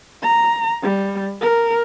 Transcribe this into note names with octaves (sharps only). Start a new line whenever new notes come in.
A#5
G3
A#4